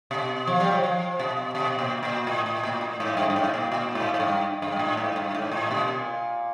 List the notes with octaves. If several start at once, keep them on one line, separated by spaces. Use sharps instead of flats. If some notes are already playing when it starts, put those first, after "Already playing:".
B2
F3
G3
F#3
F3
B2
B2
A#2
A#2
A2
A2
A#2
A2
G#2
G2
G2
G#2
A#2
A#2
G#2
G#2
G2
G2
A2
G#2
G2
G#2
A2
B2
A#2